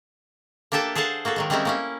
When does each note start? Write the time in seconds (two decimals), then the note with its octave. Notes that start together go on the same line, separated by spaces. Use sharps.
0.72 A#3 D4 G4 A4 E5 A5
0.95 G#4 A4 C5 F5 F#5 A5
1.25 A#3 F#4 G#4 A4
1.36 D#3 F#3 G#3
1.50 G3 G#3 C4 C#4 D#4 E4
1.65 A#3 C#4 E4